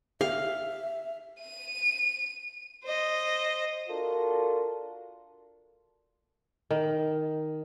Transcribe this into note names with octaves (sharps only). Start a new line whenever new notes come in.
G4 E5 F5
D#7
C5 D#5
D4 F4 F#4 A4 A#4
D#3